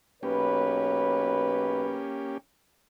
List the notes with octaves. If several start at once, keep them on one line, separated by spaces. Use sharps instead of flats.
B1 A#3 C#4 G4 B4 C#5